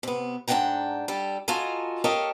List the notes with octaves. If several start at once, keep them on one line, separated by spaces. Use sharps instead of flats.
C3 B3
G#2 D4 D5 F#5 G5 A#5
G3 G4 A4
F4 F#4 A4 D#5 G#5 A#5
G4 A4 A#4 C#5 D#5 F5